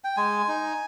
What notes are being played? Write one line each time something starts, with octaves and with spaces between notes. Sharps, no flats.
G5
G#3 G#5
D#4